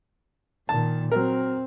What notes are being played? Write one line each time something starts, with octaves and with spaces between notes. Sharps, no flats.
A#2 D#3 A5
F#3 C4 A#4